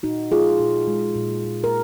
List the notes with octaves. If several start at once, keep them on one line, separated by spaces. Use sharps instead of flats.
A#2 D#4 F#4
G#3 F4 G#4
A#2
G#3
A#2
G#3
A#4